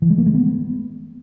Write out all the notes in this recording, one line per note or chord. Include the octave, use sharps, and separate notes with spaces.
E3
G#3
A#3
G#3
B3